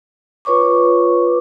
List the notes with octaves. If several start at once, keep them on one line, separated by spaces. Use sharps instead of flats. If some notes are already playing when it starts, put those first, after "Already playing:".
F4 B4 C#5 C#6 D6